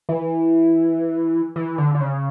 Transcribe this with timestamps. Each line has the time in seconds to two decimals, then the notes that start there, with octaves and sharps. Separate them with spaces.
0.09 E3
1.56 E3
1.78 D3
1.95 D3
2.00 C#3